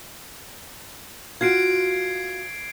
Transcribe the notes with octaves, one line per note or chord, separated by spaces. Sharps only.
F4 F#4 G#6 C7 D7